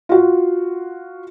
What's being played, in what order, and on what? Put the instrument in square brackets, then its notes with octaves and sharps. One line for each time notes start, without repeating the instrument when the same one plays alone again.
[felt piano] F4 F#4